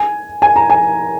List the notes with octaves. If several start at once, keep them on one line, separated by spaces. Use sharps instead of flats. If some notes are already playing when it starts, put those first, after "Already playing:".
Already playing: G#5
G#5
A#5
G#5